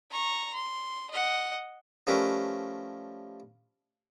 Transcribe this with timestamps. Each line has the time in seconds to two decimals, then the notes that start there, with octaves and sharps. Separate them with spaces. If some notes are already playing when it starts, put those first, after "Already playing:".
0.11 A#5 C#6
0.53 C6
1.10 D#5 F#5
2.07 F3 G3 A3 C#4 A#4 B4